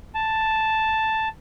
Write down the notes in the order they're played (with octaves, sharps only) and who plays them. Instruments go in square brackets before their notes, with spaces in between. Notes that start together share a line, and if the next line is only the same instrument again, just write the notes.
[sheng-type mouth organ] A5